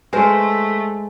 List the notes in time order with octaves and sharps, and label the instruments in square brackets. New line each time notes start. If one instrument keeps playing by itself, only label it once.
[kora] G#3 C5 [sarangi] A3 [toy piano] B4 G#5